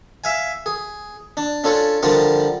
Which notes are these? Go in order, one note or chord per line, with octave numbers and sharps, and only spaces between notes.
E5 F5 G#5
G#4
D4
C#4 D4 F4 A4 C#5
D3 F3 G3 D4 F4 A#4